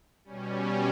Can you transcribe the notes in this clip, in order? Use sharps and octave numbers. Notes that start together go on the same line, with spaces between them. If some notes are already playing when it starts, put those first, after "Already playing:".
B2 G3 C#4